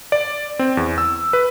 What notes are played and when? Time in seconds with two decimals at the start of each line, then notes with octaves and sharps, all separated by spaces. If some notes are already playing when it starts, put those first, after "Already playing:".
0.12 D5
0.59 C4
0.77 E2
0.98 E6
1.33 B4